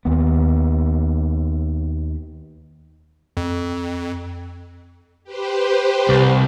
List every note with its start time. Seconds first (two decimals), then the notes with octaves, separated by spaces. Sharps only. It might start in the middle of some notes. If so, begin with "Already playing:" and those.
0.05 D#2 B3
3.37 F2
5.24 G4 B4 C5
6.09 C2